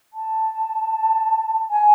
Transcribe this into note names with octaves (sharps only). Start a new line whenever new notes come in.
A5
G#5